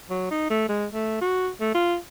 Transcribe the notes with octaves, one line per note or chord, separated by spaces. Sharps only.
F#3
D#4
A3
G#3
A3
F#4
A3
F4